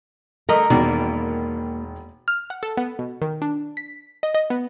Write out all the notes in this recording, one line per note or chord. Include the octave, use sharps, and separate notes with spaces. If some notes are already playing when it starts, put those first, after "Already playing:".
D3 A3 A#4 D#5
E1 B2 D#3 A#3 D5
F6
F#5
A4
B3
B2
D#3
D4
B6
D#5
D#5
B3